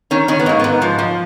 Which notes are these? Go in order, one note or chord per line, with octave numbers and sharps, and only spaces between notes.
D#3 C#4
D#3 C#4
B3
G#2 A#3
G#2 B3
F3
F3